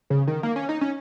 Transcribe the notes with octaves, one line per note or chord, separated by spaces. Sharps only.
C#3
D#3
A#3
C#4
D#4
C#4